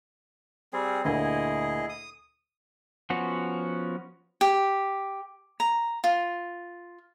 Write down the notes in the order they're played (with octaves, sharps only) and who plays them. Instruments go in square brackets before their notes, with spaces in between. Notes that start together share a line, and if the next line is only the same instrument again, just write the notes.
[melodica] G3 C4 G#4
[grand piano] D2 A#2 [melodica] E4 G#4 D#5
[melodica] D#6
[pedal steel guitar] F3 B3 C#4 F#4
[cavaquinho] G4
A#5
F4